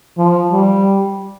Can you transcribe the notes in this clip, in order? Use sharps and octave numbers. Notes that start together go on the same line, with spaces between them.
F3
G3